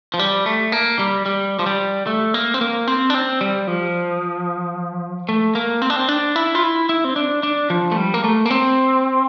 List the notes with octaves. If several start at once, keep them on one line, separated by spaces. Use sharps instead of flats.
F3
G3
A3
A#3
G3
G3
F3
G3
A3
A#3
C4
A#3
C4
D4
C4
G3
F3
A3
A#3
C4
D4
C4
D4
E4
F4
E4
E4
C4
D4
D4
F3
A3
G3
A#3
A3
A#3
C4